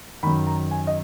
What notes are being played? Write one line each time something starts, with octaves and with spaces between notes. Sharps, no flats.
F#2 D#3 B5
A#5
G#5
D#5